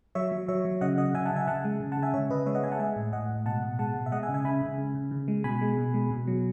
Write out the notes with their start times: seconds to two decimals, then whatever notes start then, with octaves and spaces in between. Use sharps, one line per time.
0.15 F#3 C#5 E5
0.32 F#3
0.48 F#3 C#5 E5
0.65 F#3
0.81 C#3 D#5 F#5
0.98 C#3 D#5 F#5
1.14 C#3 E5 G#5
1.26 F#5 A5
1.31 C#3
1.36 E5 G#5
1.47 C#3 F#5 A5
1.64 G#3
1.80 C#3
1.92 F#5 A5
1.97 C#3
2.02 E5 G#5
2.14 C#3 C#5 E5
2.30 C#3 B4 D#5
2.46 G#3 C#5 E5
2.55 D#5 F#5
2.63 G#3 E5 G#5
2.72 F#5 A5
2.80 G#3 E5 G#5
2.96 A2
3.13 A2 D#5 F#5
3.29 A2
3.46 B2 F#5 A5
3.63 B2
3.79 G#3 F#5 A5
3.95 B2
4.06 E5
4.12 G#3 D#5 F#5
4.23 E5 G#5
4.29 C#3
4.34 E5 G#5
4.45 C#3 G#5 B5
4.61 C#3
4.78 C#3
4.95 C#3
5.11 C#3
5.28 G#3
5.44 B2 G#5 B5
5.61 G#3
5.77 B2
5.94 G#3
6.11 B2
6.27 F#3